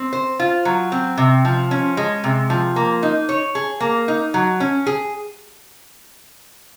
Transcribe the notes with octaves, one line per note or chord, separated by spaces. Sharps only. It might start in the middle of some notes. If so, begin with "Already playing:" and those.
Already playing: C4
C5
F4
F#3
C4
C3
F3
C#4
G#3
C3
F3
A#3
D#4
C#5
G#4
A#3
D#4
F#3
C#4
G#4